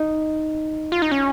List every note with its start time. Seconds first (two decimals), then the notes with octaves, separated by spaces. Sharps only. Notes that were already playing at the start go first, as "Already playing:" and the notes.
Already playing: D#4
0.92 F4
1.02 D#4
1.11 C#4